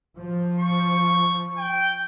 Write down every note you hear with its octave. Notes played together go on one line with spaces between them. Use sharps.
F3
C#6
G5